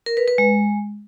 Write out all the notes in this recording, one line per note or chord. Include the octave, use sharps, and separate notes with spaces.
A#4
B4
B4
G#3